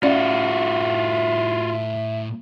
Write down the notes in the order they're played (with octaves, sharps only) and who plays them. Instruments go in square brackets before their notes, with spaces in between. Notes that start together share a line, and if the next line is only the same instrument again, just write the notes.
[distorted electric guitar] A2 D#4 [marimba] C#4 D5 [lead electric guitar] F4 F#4 [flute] E5